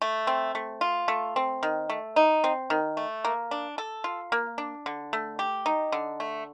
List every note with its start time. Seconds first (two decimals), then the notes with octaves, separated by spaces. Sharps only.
0.02 A3
0.27 C4
0.55 A3
0.81 F4
1.08 A3
1.36 C4
1.63 D#3
1.90 A3
2.16 D#4
2.44 C4
2.70 D#3
2.97 A3
3.25 A#3
3.51 D4
3.78 A4
4.04 F4
4.32 A#3
4.58 D4
4.86 D3
5.13 A3
5.39 G4
5.66 D#4
5.92 D3
6.20 A3